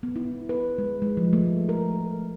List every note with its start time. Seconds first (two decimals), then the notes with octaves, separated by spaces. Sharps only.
0.03 B3
0.16 E4
0.49 B4
0.78 G#3
1.02 G#3
1.17 F3
1.33 A3
1.69 A#4